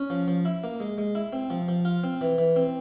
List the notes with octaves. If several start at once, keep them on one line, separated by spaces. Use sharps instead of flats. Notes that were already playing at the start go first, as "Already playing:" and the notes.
Already playing: C#4
F3
F3
E4
A#3
G#3
G#3
E4
C4
F3
F3
F4
C4
E3
E3
C4